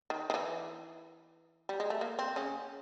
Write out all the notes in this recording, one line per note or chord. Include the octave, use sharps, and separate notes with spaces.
D#3
D#3
E3
G3
G#3
A3
A#3
C4
C#3 C#4